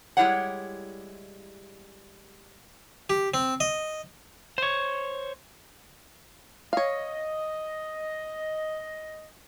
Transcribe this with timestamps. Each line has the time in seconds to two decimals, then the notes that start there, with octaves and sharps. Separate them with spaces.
0.17 G3 G#3 E4 G4 C#5 F#5
3.10 G4
3.34 C4
3.60 D#5
4.58 C5 C#5
6.73 C#5 D#5 F5